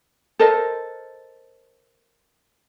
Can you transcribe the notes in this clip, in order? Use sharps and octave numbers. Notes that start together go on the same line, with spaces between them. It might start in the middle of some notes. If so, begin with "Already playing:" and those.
A4 A#4 C5 D#5